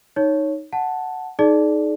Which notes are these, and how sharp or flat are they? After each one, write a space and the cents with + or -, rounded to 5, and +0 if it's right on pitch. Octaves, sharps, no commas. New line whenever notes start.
D#4 +0 C#5 +0
F#5 +0 A5 +0
D#4 +0 G#4 +40 D5 +0